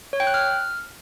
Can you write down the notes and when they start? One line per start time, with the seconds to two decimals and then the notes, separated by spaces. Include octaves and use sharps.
0.13 C#5
0.20 G5
0.27 F#6
0.34 F6